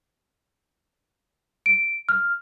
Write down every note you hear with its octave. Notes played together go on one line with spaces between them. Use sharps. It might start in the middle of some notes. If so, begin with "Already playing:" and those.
D7
F6